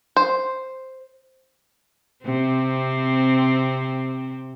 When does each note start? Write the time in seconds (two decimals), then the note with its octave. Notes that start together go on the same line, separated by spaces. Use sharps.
0.16 C5
2.25 C3 C4